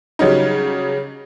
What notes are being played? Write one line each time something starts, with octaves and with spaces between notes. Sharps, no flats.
C#3 F#3 G3 C#4 D#4